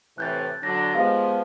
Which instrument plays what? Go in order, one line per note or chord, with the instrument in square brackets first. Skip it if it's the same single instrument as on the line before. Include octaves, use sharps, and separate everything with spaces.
[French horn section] A2 C3 E3 [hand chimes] F#6 G6 A6
[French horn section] D3 F#3 D4 [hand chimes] A#6
[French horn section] F3 G#3 B3 [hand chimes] G4 F5